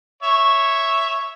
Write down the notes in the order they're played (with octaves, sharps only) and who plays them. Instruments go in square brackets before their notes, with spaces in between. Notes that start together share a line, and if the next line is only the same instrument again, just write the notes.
[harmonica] C#5 E5